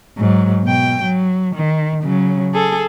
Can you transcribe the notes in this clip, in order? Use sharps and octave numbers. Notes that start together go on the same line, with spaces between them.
G#2 F#3
B2 G5
F#3
D#3
C#3 F#3
G#4 A4